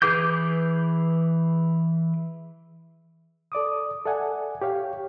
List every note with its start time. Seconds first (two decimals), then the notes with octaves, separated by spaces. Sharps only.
0.02 E3 G#4 B4 D6 G6
3.52 A4 D5 D6 D#6
4.06 A4 D5 E5 F#5 G#5
4.62 G4 C#5 F5 G5